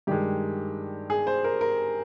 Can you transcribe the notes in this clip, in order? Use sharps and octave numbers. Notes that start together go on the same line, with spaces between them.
G2 D#3 G#3 G4
G#4
C5
A#4
A#4